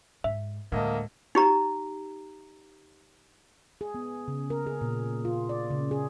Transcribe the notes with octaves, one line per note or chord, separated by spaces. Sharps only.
G#2 E5
D2 A2 G#3 A#3 D#5 A5
D#4 G4 A#5
G#4
B3
C#3
A#4
G#4
A#2
F4
D5
C#3
G#4